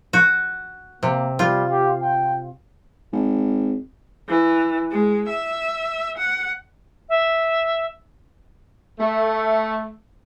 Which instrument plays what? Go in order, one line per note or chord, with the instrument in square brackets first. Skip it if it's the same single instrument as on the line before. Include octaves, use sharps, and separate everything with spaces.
[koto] F#4
[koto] C3 [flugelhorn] A#3
[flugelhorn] G3 [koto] F4
[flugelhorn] G4
G5
[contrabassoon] G#1
[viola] E3
G#3
E5
F#5
[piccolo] E5
[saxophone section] A3